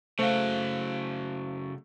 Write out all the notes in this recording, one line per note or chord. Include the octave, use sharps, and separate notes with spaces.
C#3 F#3 A3 C5 F5